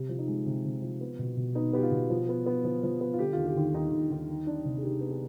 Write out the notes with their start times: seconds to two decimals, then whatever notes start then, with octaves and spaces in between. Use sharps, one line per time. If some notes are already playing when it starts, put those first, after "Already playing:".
Already playing: C3 G4
0.09 F3
0.19 D#4
0.28 G#3
0.46 C3
0.65 C3
0.82 F3
1.01 B3
1.19 B2
1.37 B2
1.55 B3 D#4
1.73 B3 G4
1.83 F4
1.91 B2
2.10 F3
2.29 B3
2.46 B3
2.65 F3
2.83 F3
3.01 B3
3.14 F4
3.19 D3 G4
3.33 D#2 F4
3.47 G4
3.56 D#2
3.61 F4
3.74 D#2 D#4
3.92 D#2
4.11 D#2
4.29 D#3
4.47 D4
4.65 C3
4.78 G#4
4.83 D#3 G4
5.01 B3
5.10 G#4